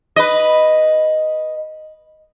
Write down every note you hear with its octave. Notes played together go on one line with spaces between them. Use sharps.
B4 D#5